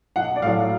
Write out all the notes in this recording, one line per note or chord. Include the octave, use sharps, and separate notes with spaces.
B1 F#5
D5
A2 F#3 F5